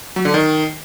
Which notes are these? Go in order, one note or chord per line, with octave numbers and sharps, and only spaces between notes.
F#3
D3
D#3